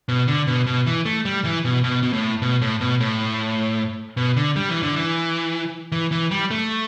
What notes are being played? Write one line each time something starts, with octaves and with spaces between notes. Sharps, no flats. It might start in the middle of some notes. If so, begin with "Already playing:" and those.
B2
D3
B2
B2
E3
A3
G3
E3
B2
B2
B2
A2
B2
A2
B2
A2
B2
D3
G3
E3
D3
E3
E3
E3
G3
A3